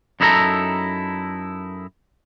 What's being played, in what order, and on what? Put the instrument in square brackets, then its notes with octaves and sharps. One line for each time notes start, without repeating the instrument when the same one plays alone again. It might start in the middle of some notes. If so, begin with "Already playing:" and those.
[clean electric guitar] F#2 D#4 E4 F#4 A4 A#5